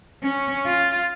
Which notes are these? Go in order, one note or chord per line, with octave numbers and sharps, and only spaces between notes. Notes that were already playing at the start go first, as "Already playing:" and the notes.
C#4
F4